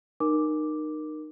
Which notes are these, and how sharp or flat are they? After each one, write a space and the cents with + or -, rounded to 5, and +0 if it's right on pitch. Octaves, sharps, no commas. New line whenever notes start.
D#4 -25 A#4 +5 D6 +0